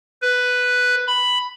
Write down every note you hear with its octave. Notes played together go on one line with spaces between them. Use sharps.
B4
B5